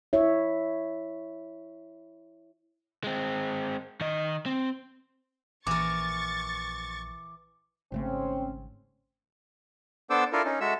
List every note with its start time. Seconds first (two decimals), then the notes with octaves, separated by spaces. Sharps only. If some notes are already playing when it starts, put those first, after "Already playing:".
0.13 E4 C#5 E5
3.04 G#3 C4
4.01 D#3 D#5
4.46 C4
5.67 A#1 E3 A#4 C#6 D6 A6
7.92 G#1 C#3 A3 C4 C#4
10.10 B3 D4 A4 C5 D6 E6
10.33 D4 E4 F4 A4 A#4
10.45 C#4 D#4
10.61 G#3 F#4 A4 E5 E6